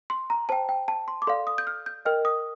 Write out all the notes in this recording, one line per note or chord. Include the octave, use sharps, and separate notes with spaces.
C6
A#5
C5 G5 A5
G5
A5
C6
D6
A4 D5 F5 C6
D#6
G6
F6
G6
A#4 D#5 G5 F6
D#6